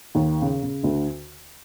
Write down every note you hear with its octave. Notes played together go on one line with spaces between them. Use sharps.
D#2 D#3
C#3
C#3
D2 D3